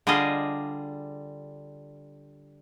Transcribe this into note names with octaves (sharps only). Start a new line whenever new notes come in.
D3 G3 F4 G#4 D#5